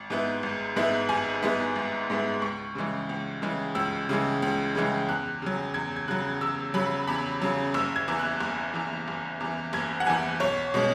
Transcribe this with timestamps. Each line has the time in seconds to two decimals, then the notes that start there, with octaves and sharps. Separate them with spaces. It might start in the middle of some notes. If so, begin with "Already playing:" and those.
Already playing: G#1
0.10 G#2 G#3 B3 E4
0.43 G#1
0.76 G#2 G#3 B3 E4
1.09 G#1 G#5
1.42 G#2 G#3 B3 E4
1.76 G#1
2.10 G#2 G#3 B3 E4
2.42 C#2 C#6
2.75 C#3 E3 G#3
3.09 C#2
3.42 C#3 E3 G#3
3.75 C#2 E6
4.09 C#3 E3 G#3
4.42 C#2
4.75 C#3 E3 G#3
5.08 E2 F#6
5.42 C#3 F#3
5.74 E2 G#6
5.96 G#6
6.08 C#3 F#3 F#6
6.41 E2 E6
6.74 C#3 F#3 B5
7.08 E2 B5
7.42 C#3 F#3
7.74 F#1 E6
7.96 G#6
8.08 E2 E3
8.19 F#6
8.41 F#1
8.74 E2 E3
9.08 F#1
9.40 E2 E3
9.73 F#1 G#6
10.00 F#5
10.07 E2 E3 G#5
10.40 B1 C#5
10.74 B2 G#3 C#4